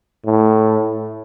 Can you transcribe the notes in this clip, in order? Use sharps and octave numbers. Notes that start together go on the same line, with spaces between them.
A2